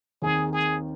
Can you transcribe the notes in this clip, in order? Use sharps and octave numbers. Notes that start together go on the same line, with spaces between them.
D#2 D#3 C4 G#4
G#4